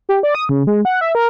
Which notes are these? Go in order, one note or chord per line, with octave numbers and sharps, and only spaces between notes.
G4
D5
D#6
C#3
G#3
F#5
E5
A#4